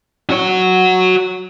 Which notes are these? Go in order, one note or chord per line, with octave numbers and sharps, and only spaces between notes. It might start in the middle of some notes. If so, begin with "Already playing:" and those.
F#4 C#5